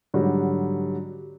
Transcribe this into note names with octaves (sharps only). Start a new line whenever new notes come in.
G#2 D3 F#3 G3